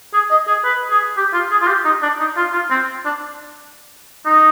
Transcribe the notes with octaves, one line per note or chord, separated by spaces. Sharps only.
G#4
D#5
G#4
B4
G#4
G4
F4
G#4
F4
G4
D#4
D4
D#4
F4
F4
C4
D4
D#4